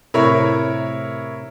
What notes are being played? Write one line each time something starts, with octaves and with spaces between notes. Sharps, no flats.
A2 C3 E4 A#4 C#5